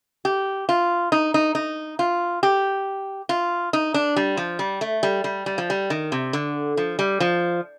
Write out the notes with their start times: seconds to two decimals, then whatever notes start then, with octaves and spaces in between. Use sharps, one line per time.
0.25 G4
0.69 F4
1.12 D#4
1.34 D#4
1.55 D#4
1.99 F4
2.43 G4
3.29 F4
3.73 D#4
3.94 D4
4.16 G3
4.37 F3
4.59 G3
4.81 A3
5.03 G3
5.24 G3
5.46 G3
5.58 F3
5.70 G3
5.90 D#3
6.12 C3
6.33 D3
6.77 F3
6.99 G3
7.20 F3